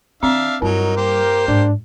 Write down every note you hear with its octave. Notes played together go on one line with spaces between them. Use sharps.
D#3 C4 D4 E5 F5
G2 F#3 G3 D#4 A#4
A#3 G4 C5
G#2 D4